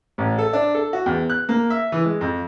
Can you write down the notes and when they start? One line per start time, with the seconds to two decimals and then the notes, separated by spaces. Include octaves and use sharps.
0.18 A1
0.38 A4
0.53 D4
0.74 A4
0.93 F#4
1.06 E2
1.30 F#6
1.49 A#3
1.70 E5
1.92 E3
2.05 G#3
2.21 F2